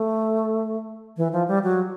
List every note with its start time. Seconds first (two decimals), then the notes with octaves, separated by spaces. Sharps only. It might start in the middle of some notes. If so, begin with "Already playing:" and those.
Already playing: A3
1.17 E3
1.33 F3
1.48 G3
1.63 F#3